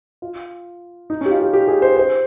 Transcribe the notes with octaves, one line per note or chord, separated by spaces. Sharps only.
F4
D#4
C#4 G4
F4
G4
G4
G#4
C5
C5